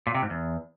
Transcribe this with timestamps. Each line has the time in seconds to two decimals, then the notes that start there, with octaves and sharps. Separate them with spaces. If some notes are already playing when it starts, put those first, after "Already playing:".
0.07 A#2
0.15 C3
0.22 G#2
0.30 E2